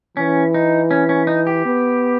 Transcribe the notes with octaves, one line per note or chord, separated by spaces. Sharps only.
E3 C#4
D#4
C#4
C#4
D#4
G4
B3